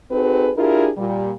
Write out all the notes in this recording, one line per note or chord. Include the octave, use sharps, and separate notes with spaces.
C4 D#4 F#4 G#4 A4 B4
D4 E4 F4 G4 G#4 A#4
A#2 G3